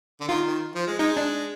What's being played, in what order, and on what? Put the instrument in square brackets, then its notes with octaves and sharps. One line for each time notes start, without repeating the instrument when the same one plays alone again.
[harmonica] D3
[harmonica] D#3 [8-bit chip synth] F4
[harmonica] D#3
F3
G#3
[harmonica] G#3 [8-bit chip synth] D#4
[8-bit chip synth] D4